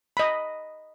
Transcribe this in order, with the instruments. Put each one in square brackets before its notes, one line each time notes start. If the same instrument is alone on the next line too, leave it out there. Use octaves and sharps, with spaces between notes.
[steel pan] D#5 B5